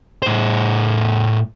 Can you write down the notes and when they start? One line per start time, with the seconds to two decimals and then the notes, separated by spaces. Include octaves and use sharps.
0.23 A2 C5